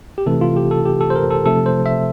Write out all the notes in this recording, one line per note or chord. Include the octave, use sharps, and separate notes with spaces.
G4
C3 E3 A3 A4
F4
G4
A4
G4
A4
C5
A#4
A4
C3 F3 A3 A4
C5
E5